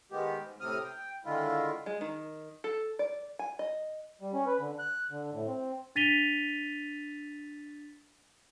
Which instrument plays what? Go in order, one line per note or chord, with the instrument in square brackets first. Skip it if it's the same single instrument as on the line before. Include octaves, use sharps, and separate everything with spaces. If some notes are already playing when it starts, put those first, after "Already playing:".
[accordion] D#3 G#3 B3 G4
G#2
A2 C3 C4 D#6 F6
G5
D3 D#3 G#3 E4 F4
[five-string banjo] G#3
D#3
A4
D5
G#5
D#5
[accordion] G3
C#4
B4
D3
F#6
D3
A2
C4
[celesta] D4 A6 B6 D#7 F7 G7